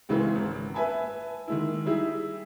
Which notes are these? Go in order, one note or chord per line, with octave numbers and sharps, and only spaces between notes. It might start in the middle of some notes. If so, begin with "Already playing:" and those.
C#2 C#3 E3 G#3 C4
G#1
B4 E5 G#5 A5 B5
D#3 G#3 E4
G3 D#4 E4 G4 G#4